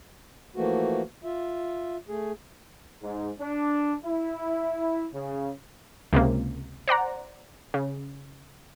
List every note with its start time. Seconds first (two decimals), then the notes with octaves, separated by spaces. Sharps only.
0.56 E3 F3 A3 A#3 F#4
1.24 F4 E5
2.09 A3 G#4
3.01 G#2
3.40 D4
4.04 E4
5.13 C#3
6.13 C#2 C3 A#3
6.88 C5 D5 F#5 A#5
7.74 C#3